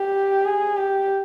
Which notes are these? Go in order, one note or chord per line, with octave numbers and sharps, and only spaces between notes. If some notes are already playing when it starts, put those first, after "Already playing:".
Already playing: G4
G#4
G4